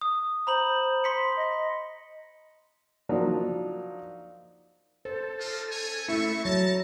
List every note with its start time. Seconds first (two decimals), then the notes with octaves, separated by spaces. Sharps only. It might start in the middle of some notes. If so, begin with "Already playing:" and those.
0.01 D#6
0.47 C5 A#5 B5 F#7
1.04 C6 B6 C#7
1.37 D#5
3.09 F3 F#3 A#3 D4 D#4
5.05 A4 C5
5.40 D4 D#4 F4
5.72 C#4 C#5 G#5
6.08 A3 C4 E4 E5 C#6
6.45 F#3 A5 A#5